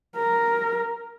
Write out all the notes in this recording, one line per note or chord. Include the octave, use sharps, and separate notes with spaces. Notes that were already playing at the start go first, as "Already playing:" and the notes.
A#4